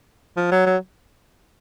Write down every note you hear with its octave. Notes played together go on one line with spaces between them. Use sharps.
F3
F#3
F#3